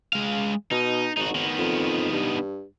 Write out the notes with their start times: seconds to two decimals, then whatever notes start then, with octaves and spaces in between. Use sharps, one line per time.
0.13 G#3 F5
0.71 B2 D#4
1.17 G#1 D#4 F#4
1.35 D#3 B3
1.58 F2
2.12 G2